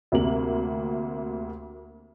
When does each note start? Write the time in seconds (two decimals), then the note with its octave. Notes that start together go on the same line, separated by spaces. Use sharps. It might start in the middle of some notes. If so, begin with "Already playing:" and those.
0.12 D2 C3 A#3 F#7